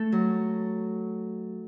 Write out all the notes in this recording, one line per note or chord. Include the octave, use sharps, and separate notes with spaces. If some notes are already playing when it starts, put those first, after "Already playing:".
Already playing: A3 A4
F#3